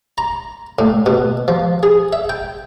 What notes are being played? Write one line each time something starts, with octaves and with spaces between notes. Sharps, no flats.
A#5
A2
B2
F3
G#4
E5
G5